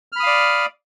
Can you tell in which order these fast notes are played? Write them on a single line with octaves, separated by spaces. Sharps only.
F6 B5 D#6 F5 D5